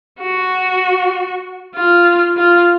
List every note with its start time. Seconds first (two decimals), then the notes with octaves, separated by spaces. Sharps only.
0.21 F#4
1.76 F4
2.37 F4